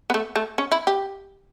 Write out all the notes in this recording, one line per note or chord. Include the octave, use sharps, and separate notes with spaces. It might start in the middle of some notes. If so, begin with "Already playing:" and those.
B3
A3
A3
C#4
E4
G4